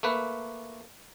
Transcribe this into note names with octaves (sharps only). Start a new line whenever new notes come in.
A3 A#3 B4